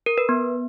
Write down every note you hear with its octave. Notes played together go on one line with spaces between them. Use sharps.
A#4
B4
B3